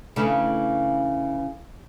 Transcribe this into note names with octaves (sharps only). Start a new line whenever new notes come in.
C#3 E3 A3 D4